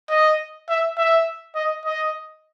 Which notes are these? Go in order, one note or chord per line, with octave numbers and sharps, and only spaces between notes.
D#5
E5
E5
D#5
D#5